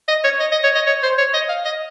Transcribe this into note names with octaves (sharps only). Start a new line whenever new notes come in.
D#5
C#5
D#5
D#5
C#5
D#5
C#5
C5
C#5
D#5
F5
D#5